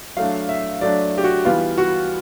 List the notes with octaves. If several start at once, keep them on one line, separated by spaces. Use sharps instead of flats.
F#3 A3 D4 F5
E5
F#3 A3 D4 D5
G4
F#4
E3 G3 B3 F4
F#4